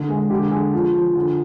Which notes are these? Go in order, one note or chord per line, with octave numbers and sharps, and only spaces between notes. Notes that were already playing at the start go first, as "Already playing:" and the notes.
Already playing: D3
G#3
D3 G4
D3 G#4
F3
F3
D3